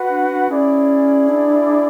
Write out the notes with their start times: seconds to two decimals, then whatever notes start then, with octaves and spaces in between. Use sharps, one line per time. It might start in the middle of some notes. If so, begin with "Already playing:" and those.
Already playing: F#4 B4 F#5
0.09 D4
0.30 D4
0.48 C#4 E4 G#4 D5
1.29 D4